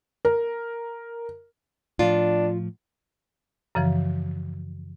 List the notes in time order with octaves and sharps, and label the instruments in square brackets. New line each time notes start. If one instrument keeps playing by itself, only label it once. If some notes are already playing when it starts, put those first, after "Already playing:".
[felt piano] A#4
[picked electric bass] A2 F3 [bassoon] D4 [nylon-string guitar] F4
[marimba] F#2 C#3 E3 F3